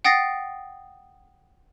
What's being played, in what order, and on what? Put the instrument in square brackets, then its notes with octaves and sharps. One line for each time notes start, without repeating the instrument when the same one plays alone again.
[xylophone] F#5 G5 D#6 A6 A#6 C7